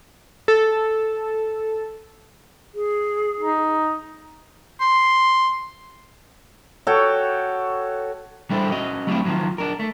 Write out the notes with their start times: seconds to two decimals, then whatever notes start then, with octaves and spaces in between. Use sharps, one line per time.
0.48 A4
2.75 G#4
3.40 D#4
4.81 C6
6.87 F#4 A4 C#5 G5
8.50 G3 D4 E4 A4 C5
8.72 C#4 F#4 D#5
9.07 F#3 G3 A3 C4 D4 E4
9.25 D#3 F3 F#3
9.58 D4 A#4
9.79 A3